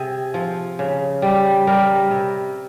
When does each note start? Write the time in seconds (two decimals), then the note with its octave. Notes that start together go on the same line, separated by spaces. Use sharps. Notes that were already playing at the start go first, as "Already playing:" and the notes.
Already playing: C3 G#4
0.34 F3
0.79 C#3
1.22 G3
1.67 G3 A#4
2.11 C3